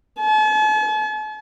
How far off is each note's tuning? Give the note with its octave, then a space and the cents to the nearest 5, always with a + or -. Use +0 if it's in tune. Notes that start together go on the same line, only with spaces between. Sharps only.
A5 -45